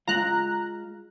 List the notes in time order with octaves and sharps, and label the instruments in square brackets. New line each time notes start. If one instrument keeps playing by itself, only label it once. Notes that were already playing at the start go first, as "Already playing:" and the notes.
[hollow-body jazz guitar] G#3 F4 F5 [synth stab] A#5 F#6